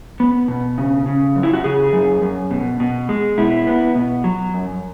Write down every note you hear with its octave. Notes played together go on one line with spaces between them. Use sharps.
B3
B2
C#3
C#3
F#2
E4
F#4
C#3 G#4
F#2
F#2
B2
B2
G#3
B2 E4
B3
B2
F#3
F#2